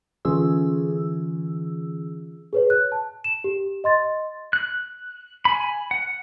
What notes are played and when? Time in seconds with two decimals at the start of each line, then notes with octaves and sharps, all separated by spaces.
0.25 D3 E3 C#4 F4 G#4 E6
2.53 G#4 B4 C#5
2.70 F#6
2.92 A5
3.24 E7
3.44 G4
3.84 D#5 C6 A6
4.53 F#6
5.45 G#5 B5
5.91 F#5